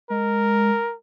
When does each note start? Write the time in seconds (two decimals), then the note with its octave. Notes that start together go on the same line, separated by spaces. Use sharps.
0.10 G#3 A#4